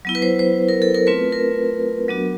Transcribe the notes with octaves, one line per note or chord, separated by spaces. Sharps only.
F#3 B3 E4
B4
C5
C5
A#4
A4
A#4
A3 C4 F4 B4
A#4
F#3 B3 D4 F#4